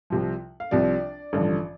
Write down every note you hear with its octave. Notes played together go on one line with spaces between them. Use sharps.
C2 C3 F3
F5
C2 C3 F3 D4 D5
A1 G2 D3 F3